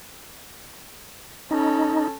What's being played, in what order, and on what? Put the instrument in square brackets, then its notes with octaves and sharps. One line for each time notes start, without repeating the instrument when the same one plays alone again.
[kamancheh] C#4 A4 [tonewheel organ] D#4